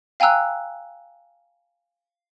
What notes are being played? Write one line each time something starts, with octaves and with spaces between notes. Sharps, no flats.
F5 G5 G#5 A#5 E6 F#6